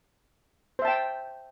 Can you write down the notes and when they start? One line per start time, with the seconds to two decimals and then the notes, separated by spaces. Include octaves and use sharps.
0.79 C5
0.82 E5
0.85 A5
0.88 G5